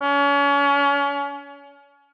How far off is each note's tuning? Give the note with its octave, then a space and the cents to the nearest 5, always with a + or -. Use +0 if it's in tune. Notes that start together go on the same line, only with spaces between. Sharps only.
C#4 +35